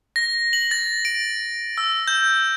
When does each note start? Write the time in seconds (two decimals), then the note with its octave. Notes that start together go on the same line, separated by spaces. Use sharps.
0.16 A#6
0.53 F#7
0.71 A6
1.05 D7
1.78 E6
2.08 G6